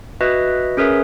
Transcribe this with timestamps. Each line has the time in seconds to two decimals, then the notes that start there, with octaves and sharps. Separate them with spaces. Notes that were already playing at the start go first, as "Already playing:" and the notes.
0.21 F#4 B4 D#5 E5
0.77 C#4 G#4 A#4 B4 C#5 E5